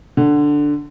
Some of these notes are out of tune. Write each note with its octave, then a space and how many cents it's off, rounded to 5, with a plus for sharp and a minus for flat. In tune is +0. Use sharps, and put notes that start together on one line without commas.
D3 +0 F#5 +0